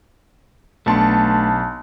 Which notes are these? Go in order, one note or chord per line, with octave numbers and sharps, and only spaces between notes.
B1 A3 B3 D4 A5 C6